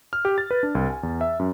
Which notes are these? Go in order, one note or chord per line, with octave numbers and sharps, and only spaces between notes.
F6
G4
A6
B4
D4
C2
G#5
E2
E5
F#2